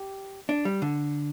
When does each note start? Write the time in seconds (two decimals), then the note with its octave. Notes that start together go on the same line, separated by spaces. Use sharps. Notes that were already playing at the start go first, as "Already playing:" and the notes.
Already playing: G4
0.49 D4
0.65 G3
0.82 D3